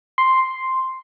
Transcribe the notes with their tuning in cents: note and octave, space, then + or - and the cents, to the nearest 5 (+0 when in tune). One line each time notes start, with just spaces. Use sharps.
C6 +0